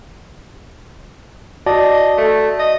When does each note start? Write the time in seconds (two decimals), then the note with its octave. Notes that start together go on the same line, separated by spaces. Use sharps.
1.66 F#4 D5 D#5 A5
2.18 A3
2.59 D#5